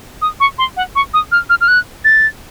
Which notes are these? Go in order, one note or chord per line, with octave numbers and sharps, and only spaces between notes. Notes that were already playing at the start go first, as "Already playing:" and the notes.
D#6
C#6
C6
F#5
C#6
D#6
F6
F6
F6
F#6
A6